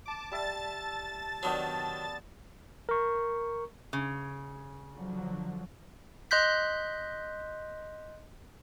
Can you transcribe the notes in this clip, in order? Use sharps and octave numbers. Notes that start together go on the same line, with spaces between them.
A5 D6
G3 E5 A5 A6
D#3 F#3 B3 D4 G5
A#4 C#6
C#3
D3 F3 F#3
D#5 C6 F#6 G6 B6